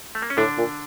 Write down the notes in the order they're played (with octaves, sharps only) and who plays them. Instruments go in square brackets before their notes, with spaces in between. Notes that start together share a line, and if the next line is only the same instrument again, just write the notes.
[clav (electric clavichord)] A3
A#3
C#4
[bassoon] A2 [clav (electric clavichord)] D3 D4
[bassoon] A#2